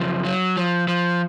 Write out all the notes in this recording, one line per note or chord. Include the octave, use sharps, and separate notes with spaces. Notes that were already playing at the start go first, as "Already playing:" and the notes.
Already playing: F#2 C#3 F3
F#3
F3
F3